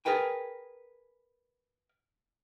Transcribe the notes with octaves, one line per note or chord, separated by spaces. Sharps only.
G#4 A#4 B4 G5 G#5